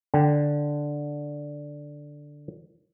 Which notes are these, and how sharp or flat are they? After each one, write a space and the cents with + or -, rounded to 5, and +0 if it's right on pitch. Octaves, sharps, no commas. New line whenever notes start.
D3 +0 G5 -20